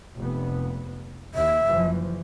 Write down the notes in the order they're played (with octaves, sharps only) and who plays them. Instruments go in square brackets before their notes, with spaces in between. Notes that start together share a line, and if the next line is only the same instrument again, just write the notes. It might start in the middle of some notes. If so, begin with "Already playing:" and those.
[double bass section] F1 B3
[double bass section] D#2 [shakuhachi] E5
[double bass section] F#1 E3 F3